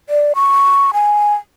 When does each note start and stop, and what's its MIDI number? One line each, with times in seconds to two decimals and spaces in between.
0.09 0.33 74
0.35 0.91 85
0.94 1.34 80